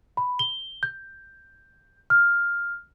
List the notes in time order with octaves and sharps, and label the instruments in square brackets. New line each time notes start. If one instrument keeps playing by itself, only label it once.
[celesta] B5
G7
G6
F6